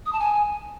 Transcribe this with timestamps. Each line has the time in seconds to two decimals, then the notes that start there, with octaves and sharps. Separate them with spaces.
0.06 D#6
0.13 A5
0.20 G#5